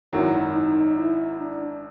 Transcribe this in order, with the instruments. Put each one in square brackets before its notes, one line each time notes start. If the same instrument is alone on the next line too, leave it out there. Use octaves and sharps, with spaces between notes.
[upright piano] G#1 F#2 D#3 F#3 [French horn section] E4
[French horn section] D#4
E4
D4